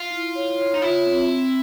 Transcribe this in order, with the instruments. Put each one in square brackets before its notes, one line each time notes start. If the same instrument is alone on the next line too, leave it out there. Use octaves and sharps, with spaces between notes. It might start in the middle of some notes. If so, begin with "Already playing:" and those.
Already playing: [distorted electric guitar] F4
[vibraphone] E4
C#5
C#5
[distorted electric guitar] D#4
[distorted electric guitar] E4 [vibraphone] F4
[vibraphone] C4
C4